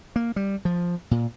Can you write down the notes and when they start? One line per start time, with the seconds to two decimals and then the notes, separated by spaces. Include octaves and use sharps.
0.16 A#3
0.36 G3
0.65 F3
1.11 A#2